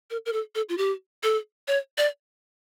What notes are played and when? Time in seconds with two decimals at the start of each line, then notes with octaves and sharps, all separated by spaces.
0.10 A#4
0.26 A#4
0.33 A4
0.55 A4
0.69 F4
0.78 G4
1.23 A4
1.68 C#5
1.98 D5